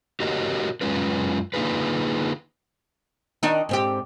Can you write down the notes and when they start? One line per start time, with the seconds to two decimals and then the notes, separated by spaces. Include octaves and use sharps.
0.20 F#4 G4 A#4 C#5 D#5
0.81 F#2 C3 G#3 C#4 F4 B4
1.54 D3 A#3 D#4 F4 G#4 B4
3.43 D#3 D4 D#4
3.69 G#2 C4 G4